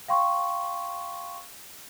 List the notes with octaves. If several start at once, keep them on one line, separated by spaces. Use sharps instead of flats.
F5 G5 C6 C#6